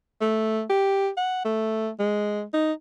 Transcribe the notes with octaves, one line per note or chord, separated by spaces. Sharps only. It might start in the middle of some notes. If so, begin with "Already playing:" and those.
A3
G4
F#5
A3
G#3
D#4